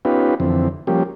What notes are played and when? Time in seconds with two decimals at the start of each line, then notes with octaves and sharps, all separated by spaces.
0.05 B3 C#4 D#4 F4 G4 B4
0.40 F2 D3 E3 C4
0.87 F3 G3 A#3 C#4 G4